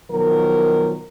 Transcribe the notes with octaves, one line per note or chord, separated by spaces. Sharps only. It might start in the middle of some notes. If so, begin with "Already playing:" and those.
B2 D#3 F3 F#3 A#4